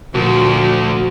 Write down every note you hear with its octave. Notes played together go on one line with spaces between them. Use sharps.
D2 A#2 F3 F#4